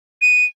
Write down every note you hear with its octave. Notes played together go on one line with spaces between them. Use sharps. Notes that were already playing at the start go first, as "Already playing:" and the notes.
D#7